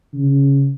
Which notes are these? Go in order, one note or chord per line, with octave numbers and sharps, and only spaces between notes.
C#3